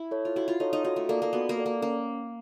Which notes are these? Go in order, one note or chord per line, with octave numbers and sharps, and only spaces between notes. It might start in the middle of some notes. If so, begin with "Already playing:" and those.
Already playing: E4
A4 C#5
F4
E4 F#4
F4
D#4 A4 C#5
D#4
D#4 F#4
A3
A#3 A4 D5
A#3
B3 F#4
A#3
A4 D5
A#3
A#3 C#4